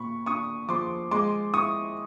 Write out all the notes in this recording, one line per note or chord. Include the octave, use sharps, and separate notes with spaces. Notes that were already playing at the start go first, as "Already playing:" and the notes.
Already playing: A#2 B5 C#6
D4 C#6 D#6
F3 C6 D6
G#3 C6 D6
E4 C#6 D#6